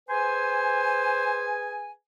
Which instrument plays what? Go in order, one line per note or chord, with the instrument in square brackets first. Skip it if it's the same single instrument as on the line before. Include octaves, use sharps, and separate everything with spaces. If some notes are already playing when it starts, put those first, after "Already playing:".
[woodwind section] G#4 B4 G#5 [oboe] C5